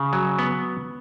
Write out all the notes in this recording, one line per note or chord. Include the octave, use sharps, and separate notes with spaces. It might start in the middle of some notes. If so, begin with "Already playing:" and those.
Already playing: C#3
F#3
B3